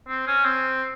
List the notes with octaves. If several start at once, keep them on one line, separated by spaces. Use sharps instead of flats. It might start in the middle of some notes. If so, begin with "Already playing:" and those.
C4
C#4
C4